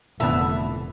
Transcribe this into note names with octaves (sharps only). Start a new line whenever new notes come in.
F1 A#2 D3 E3 B3 E5 A5